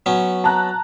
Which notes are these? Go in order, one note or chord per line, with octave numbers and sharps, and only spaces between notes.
F#3 B3 C#4
A5 A#5 F#6